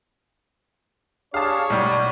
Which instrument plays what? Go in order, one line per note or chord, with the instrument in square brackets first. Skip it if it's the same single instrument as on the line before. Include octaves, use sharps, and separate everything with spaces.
[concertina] D4 G4 G#4 [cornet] C#5 [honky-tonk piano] F5 A5
[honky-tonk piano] B1 G3 [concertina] D5